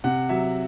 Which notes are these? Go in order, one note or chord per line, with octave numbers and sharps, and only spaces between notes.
C3 F#5
F#3 E5